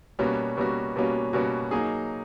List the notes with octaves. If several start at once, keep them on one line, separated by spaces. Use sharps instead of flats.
B2 G3 A#3 C#4 F#4
B2 G3 A#3 C#4 F#4
B2 G3 A#3 C#4 F#4
B2 G3 A#3 C#4 F#4
F#3 A#3 D#4 G#4